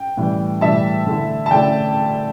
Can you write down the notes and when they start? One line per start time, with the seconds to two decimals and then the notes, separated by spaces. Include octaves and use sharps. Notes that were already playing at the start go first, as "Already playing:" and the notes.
Already playing: G5
0.17 A2 E3 G3
0.61 A2 E3 G3 E5 A5
1.06 D3 A3 E4
1.46 A5
1.51 D3 A3 E4 D5 G5